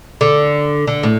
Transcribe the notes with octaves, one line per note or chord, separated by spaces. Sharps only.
D3
D3
A2